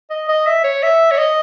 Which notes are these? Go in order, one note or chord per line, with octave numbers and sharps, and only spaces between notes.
D#5
D#5
E5
C#5
E5
C#5
D#5